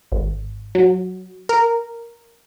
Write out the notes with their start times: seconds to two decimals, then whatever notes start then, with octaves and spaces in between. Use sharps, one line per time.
0.12 G#1
0.75 F#3
1.49 A#4